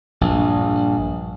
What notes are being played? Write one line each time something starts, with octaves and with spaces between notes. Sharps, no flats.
A#1 G2